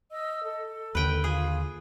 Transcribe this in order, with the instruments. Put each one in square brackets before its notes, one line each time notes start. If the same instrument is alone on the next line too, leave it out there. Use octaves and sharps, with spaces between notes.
[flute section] D#5 E6
A4
[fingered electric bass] D#2 D3 [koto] B4 G5
[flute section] F4 [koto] G#4